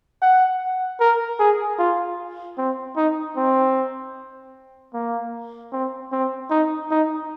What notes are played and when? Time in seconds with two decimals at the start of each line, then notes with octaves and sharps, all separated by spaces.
0.22 F#5
1.00 A#4
1.39 G#4
1.79 F4
2.58 C4
2.97 D#4
3.37 C4
4.94 A#3
5.72 C4
6.12 C4
6.51 D#4
6.91 D#4